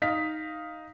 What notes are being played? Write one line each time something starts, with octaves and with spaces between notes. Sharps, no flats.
D#4 F5 B6